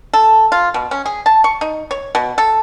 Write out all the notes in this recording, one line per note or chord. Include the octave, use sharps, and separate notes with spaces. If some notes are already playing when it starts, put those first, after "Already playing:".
A4
F4
B2
C#4
G#4
A5
C#6
D#4
C#5
B2
A4